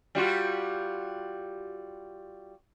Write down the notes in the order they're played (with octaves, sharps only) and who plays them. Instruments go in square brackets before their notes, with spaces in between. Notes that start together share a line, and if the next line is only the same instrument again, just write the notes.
[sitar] G3 F4 F#4